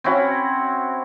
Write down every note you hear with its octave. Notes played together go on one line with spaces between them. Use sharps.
C4 C#4 E4 F#4